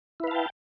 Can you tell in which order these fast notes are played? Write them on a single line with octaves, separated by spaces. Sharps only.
E4 B4 F5 A5 G5